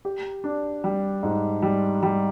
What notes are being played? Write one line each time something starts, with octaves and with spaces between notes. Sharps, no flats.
G4
D4
G3
G#2
G3
G3